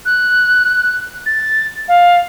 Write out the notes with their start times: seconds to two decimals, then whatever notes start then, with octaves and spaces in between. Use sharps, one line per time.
0.05 F#6
1.25 A6
1.88 F5